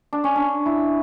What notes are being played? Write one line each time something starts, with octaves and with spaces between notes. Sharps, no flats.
D4
C#4
D4
E4